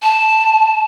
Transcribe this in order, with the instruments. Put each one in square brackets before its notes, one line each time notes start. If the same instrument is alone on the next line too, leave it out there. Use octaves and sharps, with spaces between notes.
[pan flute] A5